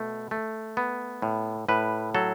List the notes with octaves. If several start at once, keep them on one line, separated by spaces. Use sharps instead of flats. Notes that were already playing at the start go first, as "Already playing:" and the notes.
Already playing: B2 A3
A3
B3
A2
A2 B4
F#3 A4